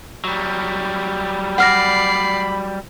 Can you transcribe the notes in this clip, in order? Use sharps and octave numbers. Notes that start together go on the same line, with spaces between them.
F#3 G3
D5 F#5 B5 F6 A#6 C7